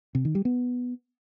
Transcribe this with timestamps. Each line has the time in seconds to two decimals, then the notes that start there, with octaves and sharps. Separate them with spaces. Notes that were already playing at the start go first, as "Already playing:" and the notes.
0.15 C3
0.25 D#3
0.35 G3
0.45 B3